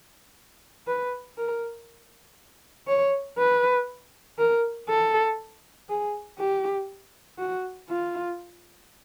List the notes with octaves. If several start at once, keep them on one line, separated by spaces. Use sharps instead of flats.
B4
A#4
C#5
B4
A#4
A4
G#4
G4
F#4
F4